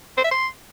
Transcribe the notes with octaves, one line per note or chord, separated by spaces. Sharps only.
C5
E5
C6